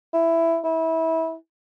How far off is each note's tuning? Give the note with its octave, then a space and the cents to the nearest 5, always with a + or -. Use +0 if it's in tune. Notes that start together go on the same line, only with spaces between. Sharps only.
E4 +5
E4 -25